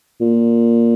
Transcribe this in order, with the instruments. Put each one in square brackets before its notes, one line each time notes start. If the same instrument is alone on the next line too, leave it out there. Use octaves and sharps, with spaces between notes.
[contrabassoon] A#2